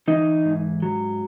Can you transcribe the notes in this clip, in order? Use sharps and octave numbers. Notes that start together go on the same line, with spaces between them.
E3 D#4
G#2
F#3